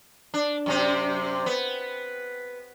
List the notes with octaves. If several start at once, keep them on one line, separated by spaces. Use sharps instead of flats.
D4
F#2 C3 C4
B3